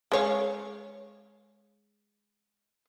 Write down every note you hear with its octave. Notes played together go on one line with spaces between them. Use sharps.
G#3 C#5 F5